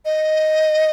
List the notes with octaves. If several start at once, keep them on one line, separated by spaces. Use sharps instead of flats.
D#5